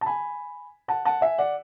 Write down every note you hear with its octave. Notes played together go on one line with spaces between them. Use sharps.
A5
G#5 B5
F#5 A5
F#5 A5
E5 G#5
D5 F#5